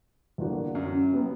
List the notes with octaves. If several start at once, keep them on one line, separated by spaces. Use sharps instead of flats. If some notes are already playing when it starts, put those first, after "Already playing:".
E2 D3 A#3 D4 F#4
F#2
F#3 B3